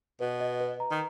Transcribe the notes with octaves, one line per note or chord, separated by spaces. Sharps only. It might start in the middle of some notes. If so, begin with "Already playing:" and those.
B2 B4
D#5
B4
A#5
D#3